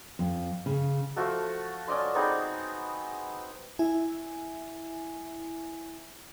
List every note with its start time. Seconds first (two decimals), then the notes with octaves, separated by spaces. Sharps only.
0.19 F2
0.66 C#3
1.16 F3 A3 F#4 A4
1.87 C#4 D5 D#5 C6
2.15 B3 C4 D#4 G#4
3.79 E4 E5 G#5